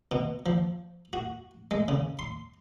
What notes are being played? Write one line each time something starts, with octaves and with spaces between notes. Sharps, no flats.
B2
F3
F#4
G#3
C#3
C6